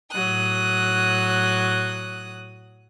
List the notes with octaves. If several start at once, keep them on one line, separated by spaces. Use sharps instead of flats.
A2 F#3 D#6 F#6